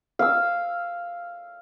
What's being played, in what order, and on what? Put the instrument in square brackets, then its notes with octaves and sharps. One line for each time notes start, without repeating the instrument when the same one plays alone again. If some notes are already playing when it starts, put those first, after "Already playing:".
[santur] F5 E6